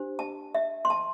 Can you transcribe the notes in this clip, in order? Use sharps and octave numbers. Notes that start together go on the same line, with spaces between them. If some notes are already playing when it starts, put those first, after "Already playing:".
Already playing: D4 G4 C5
A5
E5
C6
A5